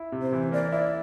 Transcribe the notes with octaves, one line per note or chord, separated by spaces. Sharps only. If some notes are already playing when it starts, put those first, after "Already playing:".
Already playing: E4
C3
C5
E3
A#3 D5
E4 D5